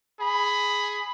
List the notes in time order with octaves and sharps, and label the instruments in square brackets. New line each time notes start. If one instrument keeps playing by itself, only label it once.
[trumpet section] G#4 B5